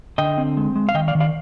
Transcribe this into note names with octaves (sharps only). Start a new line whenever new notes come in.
D3 D#5 G5
C4
G#3
G#3
F5
D#3 D#5 G5
D5 F5
D#3
D5 F5